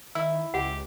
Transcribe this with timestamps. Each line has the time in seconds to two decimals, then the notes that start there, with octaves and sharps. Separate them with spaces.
0.15 D#3 E4 E6
0.54 C#2 G4 F#5